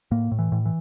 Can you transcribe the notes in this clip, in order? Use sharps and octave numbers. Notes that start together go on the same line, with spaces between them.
A2 A#3
A2
E3
A2
E3